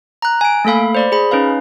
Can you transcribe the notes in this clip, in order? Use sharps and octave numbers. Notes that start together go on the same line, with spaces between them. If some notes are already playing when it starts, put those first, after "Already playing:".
A#5 F#6
G#5 D7
A3 A#3 A4 F5 B5
C5 D5 B5
G#4 B5
C#4 D#4 B4 F5